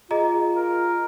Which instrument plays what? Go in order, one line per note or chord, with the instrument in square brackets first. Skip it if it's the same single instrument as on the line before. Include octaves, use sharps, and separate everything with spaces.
[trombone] F4 [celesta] G#4 D#5 A#5
[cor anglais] A#4